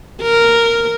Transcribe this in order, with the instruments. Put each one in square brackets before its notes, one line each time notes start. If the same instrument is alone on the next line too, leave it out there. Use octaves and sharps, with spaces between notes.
[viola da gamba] A#4